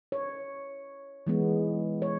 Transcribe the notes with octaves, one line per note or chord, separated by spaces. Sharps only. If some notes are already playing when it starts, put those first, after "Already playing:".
C#5
E3 G#3 B3
C#5